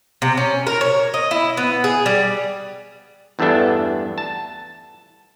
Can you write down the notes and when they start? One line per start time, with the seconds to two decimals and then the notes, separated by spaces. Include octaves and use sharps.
0.22 C3
0.37 C#4
0.67 A#4
0.81 C#5
1.14 D#5
1.31 E4
1.57 B3
1.84 G#4
2.06 G3
3.39 E2 G2 A3 B3 D4 A4
4.18 A5